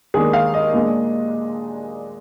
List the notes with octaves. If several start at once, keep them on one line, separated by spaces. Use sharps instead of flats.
D#2 D#3 G#3 D4 G#4
F5
D#5
A#2 G#3 D4